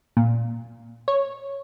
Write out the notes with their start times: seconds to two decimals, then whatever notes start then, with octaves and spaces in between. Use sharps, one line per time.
0.17 A#2
1.08 C#5